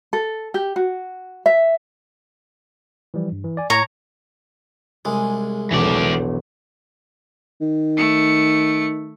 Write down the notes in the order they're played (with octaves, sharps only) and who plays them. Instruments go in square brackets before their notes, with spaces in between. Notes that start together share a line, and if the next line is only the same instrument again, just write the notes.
[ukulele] A4
G4
F#4
E5
[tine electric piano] E3 F3 G3
G2
E3
D5 G#5
[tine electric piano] A2 [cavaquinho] C#5 A#5
[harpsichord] C2 G#3 [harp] G#4
[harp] E1 B1 [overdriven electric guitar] E3 D5
[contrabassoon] D#3
[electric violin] A3 C#7